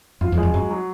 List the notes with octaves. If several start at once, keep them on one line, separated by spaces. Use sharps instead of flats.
F#2 F4
F2
G#3
F2
F#2 F#3
F#3